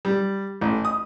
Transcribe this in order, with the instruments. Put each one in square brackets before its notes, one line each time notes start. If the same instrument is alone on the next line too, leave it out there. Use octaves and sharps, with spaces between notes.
[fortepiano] G3
A1
D#6